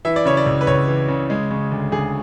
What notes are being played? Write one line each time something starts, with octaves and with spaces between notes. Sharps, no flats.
E3 E5
D5
C#3 C#5
D5
C#2
B4
C#2 C#5
E3
C#3
G#3
C#3
D2
D2 G#4